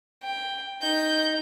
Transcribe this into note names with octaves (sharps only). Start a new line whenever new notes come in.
G5
D#4 G6